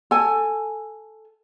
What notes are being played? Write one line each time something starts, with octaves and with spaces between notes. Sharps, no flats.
A4 G#5